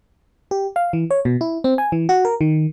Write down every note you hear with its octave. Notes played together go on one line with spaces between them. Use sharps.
G4
F5
E3
C#5
B2
E4
C4
G#5
E3
F#4
A#4
D#3